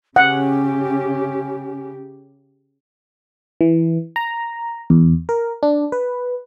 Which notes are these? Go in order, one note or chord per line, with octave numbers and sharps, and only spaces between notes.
C#3 C#4 G4 F#5
E3
A#5
E2
A#4
D4
B4